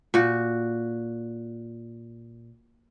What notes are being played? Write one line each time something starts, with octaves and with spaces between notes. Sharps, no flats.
A#2 F#4